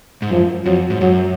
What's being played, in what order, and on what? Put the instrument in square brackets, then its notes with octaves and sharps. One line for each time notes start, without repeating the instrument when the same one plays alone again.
[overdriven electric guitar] G#2
[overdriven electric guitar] F#2 [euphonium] F3
[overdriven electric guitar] F2 [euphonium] F#3
[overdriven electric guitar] G#2
[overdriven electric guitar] F#2 [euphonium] F#3